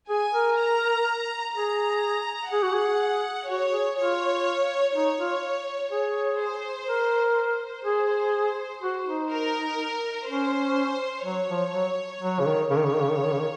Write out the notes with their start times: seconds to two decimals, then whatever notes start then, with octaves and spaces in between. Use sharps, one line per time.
0.09 G#4 G#5
0.33 A#4
0.58 A#5
1.55 G#4 A#5
2.52 G#4 F#5
2.63 F#4
2.73 G#4
3.48 F#4 C#5
3.72 G#4
3.97 F4 C#5
4.94 D#4 C#5
5.18 F4
5.91 G#4 C#5
6.39 C5
6.88 A#4
7.36 C5
7.84 G#4
8.82 F#4
9.06 D#4
9.30 A#4
10.27 C#4 C5
11.24 F#3 C#5
11.48 F3
11.73 F#3
12.21 F#3
12.39 C#3
12.46 D#3
12.70 C#3 C#5
12.77 D#3
12.85 C#3
12.93 D#3
13.01 C#3
13.09 D#3
13.17 C#3
13.25 D#3
13.32 C#3
13.40 D#3